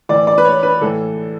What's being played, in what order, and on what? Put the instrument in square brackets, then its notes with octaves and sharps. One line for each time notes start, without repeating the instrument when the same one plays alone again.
[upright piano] A2 E3 D5
D5
B4
C#5
B4
A2 E3 A4